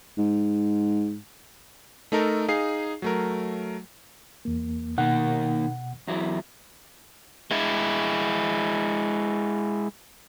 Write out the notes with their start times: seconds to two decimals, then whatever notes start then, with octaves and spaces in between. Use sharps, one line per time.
0.18 G#2
2.12 A3 D#4 A4 A#4
2.48 D#4 G#4 F5 C7
3.02 F#3 A3 A#4
4.45 E2 A#3
4.98 B2 D#3 A#3 F#5
6.07 E2 F#3 E4
7.51 G#3 E4